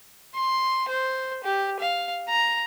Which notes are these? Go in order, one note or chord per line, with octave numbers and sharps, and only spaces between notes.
C6
C5
G4
F5
A#5